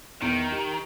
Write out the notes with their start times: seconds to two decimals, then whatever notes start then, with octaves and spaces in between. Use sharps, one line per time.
0.22 E2 D#3
0.52 G4